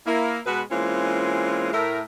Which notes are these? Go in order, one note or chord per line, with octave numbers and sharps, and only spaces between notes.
A#3 E4
B2 G#3 B3 F#4 B4
E3 G#3 A#3 C4 C#4 F4
A2 A#4 E5